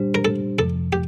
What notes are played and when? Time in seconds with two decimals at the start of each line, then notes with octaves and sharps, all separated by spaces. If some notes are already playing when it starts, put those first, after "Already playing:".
Already playing: A#2 G3 D4 G4 C5
0.15 A#4
0.25 A4
0.58 F2 C3 F3 A4
0.93 G4